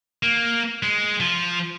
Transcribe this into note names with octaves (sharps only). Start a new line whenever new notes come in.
A#3
G#3
F3